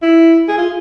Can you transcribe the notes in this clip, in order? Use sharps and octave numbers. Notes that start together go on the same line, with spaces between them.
E4
G#4
F4